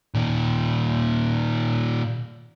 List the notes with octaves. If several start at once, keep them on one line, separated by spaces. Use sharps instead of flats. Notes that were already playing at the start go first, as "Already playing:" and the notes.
A#2 D#3